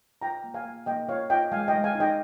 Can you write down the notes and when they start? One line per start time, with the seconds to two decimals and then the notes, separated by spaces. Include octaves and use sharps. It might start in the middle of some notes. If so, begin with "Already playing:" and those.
0.22 F4 G5 A#5
0.44 A#3
0.54 F5 G#5
0.65 A#3
0.86 A#3 D#5 G5
1.08 F4 C#5 F5
1.30 F4 D#5 G5
1.52 G#3 F5 G#5
1.68 D#5 G5
1.73 G#3
1.84 F5 G#5
1.95 D#4
2.00 D#5 G5